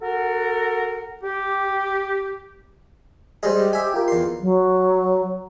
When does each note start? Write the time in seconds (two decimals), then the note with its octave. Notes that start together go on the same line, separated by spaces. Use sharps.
0.01 F#4 A4 A#4 F#5
1.23 G4
3.43 G3 G#3 G#4 C5 D#5
3.56 G4
3.73 E5 G#5
3.94 F4 A#4
4.08 E2 C6
4.40 F#3